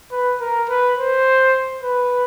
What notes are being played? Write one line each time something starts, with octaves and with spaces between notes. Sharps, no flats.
B4
A#4
B4
C5
B4